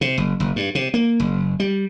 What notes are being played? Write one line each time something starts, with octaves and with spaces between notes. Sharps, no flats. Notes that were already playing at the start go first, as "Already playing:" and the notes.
C3
F#1
F#1
G2
C3
A#3
F#1
G3